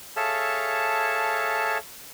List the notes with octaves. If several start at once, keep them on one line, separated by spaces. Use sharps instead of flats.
G#4 A4 C#5 E5 F5 A5